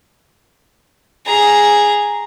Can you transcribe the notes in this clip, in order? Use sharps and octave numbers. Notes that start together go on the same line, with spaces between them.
G#4 A#5